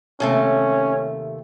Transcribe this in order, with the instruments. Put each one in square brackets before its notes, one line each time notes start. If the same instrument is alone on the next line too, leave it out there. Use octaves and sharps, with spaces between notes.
[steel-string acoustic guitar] D#2 C3 A3 [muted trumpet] C#4